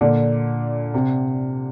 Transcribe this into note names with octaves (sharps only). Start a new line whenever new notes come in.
A#2 D3
C3